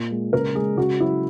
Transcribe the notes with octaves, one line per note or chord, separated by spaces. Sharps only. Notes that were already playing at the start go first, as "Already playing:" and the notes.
Already playing: A#2
G#3
C#3 A#4
G#3 G#4
C#3 F#4
F#3 E4